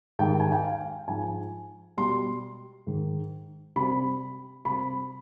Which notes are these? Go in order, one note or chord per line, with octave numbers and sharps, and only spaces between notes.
G#2 D#3 G3 G5
G#5
G5
F5
G#2 F3 G#3 G#5
B2 G3 C6
G#2 D#3 G#3
C3 G3 B5
C3 G3 B5